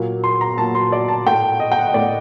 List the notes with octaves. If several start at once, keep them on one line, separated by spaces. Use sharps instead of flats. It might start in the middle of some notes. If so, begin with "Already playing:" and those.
Already playing: A#2 F#3 A#3
C6
A#5
A#2 F#3 A#3 A5
C6
D5
A5
A2 A3 G5
D#5
G5
F#5
D#5
A2 A3 D5